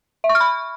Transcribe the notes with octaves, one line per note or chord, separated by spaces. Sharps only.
E5
C#6
F6
B5